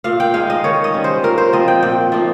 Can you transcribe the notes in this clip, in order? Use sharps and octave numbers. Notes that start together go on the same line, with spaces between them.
A#2 F5
G5
G#3 D#4 F5
D#5
D#3 C#5
D#5
G3 C#4
C5
A#2 A#4
C5
F3 C4 D#5
G5
A#2 G5
F3 A#3 D#4